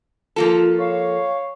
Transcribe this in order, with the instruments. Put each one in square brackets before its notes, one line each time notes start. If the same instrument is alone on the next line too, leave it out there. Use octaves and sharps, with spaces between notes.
[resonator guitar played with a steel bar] F3 A#3 A4 [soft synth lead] F4
[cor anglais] C#5 [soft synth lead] F5